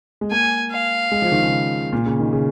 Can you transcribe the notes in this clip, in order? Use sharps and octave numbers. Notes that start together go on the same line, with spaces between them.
G#3
A#3 G#5
F5
G#3
F3
D#3
C#3
A#2
C#3
D#3
C#3